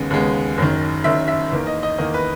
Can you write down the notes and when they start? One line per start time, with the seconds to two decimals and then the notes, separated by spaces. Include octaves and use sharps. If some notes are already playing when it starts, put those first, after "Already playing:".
Already playing: D#2 C#3 G#3 B3
0.10 D#2 C#3 G#3 B3
0.58 F#1 F#2 D#3
1.04 F#1 F#2 D#3 E5
1.28 E5
1.52 E2 D#3 A#3
1.67 D#5
1.83 D#5
1.98 E2 D#3 A#3 D#5
2.14 B4